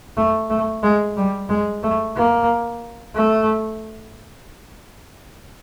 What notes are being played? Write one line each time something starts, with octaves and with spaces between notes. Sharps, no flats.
A3
A3
G#3
G3
G#3
A3
A#3
A3